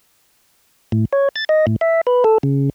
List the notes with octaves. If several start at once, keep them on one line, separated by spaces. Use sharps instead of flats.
A2
C#5
A6
D#5
A2
E5
B4
A4
C#3